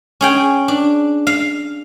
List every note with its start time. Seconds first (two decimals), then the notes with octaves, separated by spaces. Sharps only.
0.21 C#4 G#4 G5
0.68 D4
1.27 F5